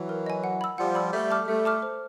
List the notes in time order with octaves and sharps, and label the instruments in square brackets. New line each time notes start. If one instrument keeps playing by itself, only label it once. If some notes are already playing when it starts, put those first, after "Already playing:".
Already playing: [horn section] E3 F#3
[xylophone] A#4
D#5 G#5
F#5
B5 E6
[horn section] F3 G3 [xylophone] F#5
[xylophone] B5 E6
[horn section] G3 A3 [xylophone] E5
[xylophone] A5 D6 F6
[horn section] G3 A3 [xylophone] E5
[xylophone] A5 D6 F6
C5